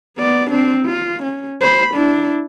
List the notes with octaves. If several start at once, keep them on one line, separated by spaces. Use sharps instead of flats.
B3 D5
C4 D4
F4
C#4
C5 B5
D4 E4